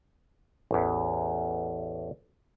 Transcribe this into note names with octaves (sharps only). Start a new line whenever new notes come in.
A1 E2